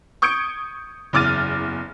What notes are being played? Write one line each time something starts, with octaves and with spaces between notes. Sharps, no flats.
C#6 D#6 G6 G#6 C#7 D7
F#1 E2 D6 F6 A6 D#7